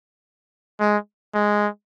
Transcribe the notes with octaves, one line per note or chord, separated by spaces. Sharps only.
G#3
G#3